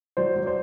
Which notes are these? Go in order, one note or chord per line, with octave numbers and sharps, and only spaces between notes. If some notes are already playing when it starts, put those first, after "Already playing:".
F#3 C5 D5
F#3
C5 D5